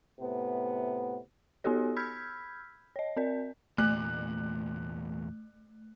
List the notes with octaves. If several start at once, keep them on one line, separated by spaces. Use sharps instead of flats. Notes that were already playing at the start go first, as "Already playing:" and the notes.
A2 C3 B3
B3 D#4 F#4 G4 A4 C#5
B5 E6 F6 G6 G#6 B6
C#5 D#5
C4 A#4 D5
E2 A#2 A3 F#6